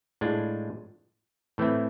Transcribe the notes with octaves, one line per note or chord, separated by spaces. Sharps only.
A2 G#3 D4 F4
A2 E3 A3 C4 E4